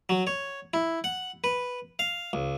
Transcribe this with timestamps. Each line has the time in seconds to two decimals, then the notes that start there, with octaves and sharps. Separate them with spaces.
0.09 F#3
0.27 C#5
0.74 E4
1.04 F#5
1.44 B4
1.99 F5
2.33 C#2